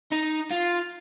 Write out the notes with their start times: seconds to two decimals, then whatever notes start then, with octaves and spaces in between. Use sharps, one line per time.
0.12 D#4
0.51 F4